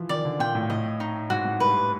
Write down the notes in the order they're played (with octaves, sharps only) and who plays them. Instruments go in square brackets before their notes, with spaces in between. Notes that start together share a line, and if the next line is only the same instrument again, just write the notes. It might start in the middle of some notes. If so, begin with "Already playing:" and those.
Already playing: [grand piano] E3 F3
[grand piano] D#3 [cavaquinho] D5
[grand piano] D3
[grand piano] A#2 [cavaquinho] G5
[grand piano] A2
[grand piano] A2 [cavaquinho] D#5
[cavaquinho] D#4
[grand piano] G#2 [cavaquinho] F#4
[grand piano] G#2
[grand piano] G2 [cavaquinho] B4